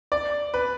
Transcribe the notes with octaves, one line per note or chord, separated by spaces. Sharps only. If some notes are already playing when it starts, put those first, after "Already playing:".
D5
B4